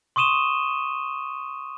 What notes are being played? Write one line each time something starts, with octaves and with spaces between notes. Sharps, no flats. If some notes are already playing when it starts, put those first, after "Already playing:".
C6 C#6 D#6 D#7 E7 G7